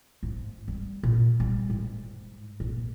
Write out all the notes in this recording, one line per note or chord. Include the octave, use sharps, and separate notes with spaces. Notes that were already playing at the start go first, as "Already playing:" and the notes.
G#2
G3
A#2
G3
G#2
A#1